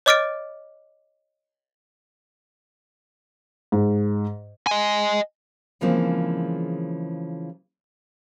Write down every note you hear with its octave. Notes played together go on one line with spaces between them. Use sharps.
C#5 D#5 D6 F6 A6 D7
G#2
D#5 G#5
C#3 E3 F3 G#3 A#3 C4